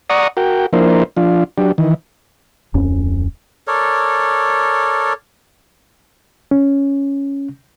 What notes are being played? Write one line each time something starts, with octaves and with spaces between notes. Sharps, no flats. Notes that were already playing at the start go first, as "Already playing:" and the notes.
D5 F#5 A#5 C#6 D#6
F#4 A#4 G5
F3 A#3 D4 E4 A#4 C5
F3 D4 F4
F#3 D4 G4
D#3 E3
D1 F2 C#4
A4 A#4 C#5 D5
C#4